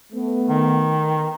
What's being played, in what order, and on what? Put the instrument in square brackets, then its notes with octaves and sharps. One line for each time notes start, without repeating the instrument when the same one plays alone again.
[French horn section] A3 B3
[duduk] D#3